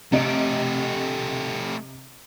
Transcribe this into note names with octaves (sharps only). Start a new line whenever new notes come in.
C3 A3 G4 D#5 D7